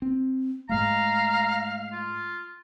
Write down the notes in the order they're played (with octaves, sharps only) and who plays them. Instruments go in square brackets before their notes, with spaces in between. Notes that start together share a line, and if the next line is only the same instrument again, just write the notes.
[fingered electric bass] C4
[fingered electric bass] G#2 G#3 A3 [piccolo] F5 [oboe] A#5
[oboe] F4